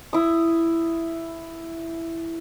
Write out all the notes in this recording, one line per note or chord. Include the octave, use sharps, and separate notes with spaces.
E4 D#6